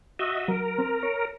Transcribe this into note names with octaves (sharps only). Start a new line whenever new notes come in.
F#4 D#5 E5
F#3 A#4
C4
C#5